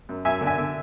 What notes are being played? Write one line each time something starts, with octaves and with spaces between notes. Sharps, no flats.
F#2
F#2 E5 G#5
D3
E5 G#5
D3